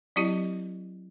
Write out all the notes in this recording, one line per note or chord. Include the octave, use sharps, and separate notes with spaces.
F#3 C4 E4 G4 D#5